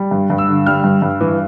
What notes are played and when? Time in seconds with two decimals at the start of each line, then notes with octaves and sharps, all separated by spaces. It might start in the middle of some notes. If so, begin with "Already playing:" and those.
Already playing: G3
0.11 G2
0.30 G2
0.38 E6
0.49 D3
0.66 G3 F6
0.84 G2
1.02 G2
1.20 E3